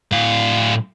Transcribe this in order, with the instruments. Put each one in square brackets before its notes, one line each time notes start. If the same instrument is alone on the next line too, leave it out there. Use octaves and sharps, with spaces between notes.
[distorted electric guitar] A2 F5